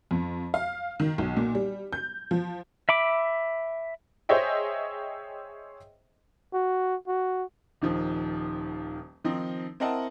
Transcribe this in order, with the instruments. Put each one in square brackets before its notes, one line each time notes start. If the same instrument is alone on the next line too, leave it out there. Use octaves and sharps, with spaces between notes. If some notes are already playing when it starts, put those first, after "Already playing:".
[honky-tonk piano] F2
F5
D#3
B1
A#2
G3
G6
F3
[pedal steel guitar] E5 B5 D6
[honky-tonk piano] G#4 C5 C#5 D#5 E5 G5
[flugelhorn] F#4
F#4
[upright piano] D#1 D#3 F3
D#3 F3 C4 D#4
C4 E4 A#4 D#5 F#5 A5